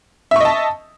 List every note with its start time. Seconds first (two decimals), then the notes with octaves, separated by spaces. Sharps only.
0.31 E5
0.36 C#6
0.40 D#5
0.45 A5